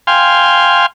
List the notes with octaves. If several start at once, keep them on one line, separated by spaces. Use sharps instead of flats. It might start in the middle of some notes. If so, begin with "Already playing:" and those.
F5 G5 G#5 C6